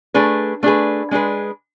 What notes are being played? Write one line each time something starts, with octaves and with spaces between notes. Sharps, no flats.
A3 D4 G#4 B4
A3 D4 G#4 B4
G#3 D4 G#4 B4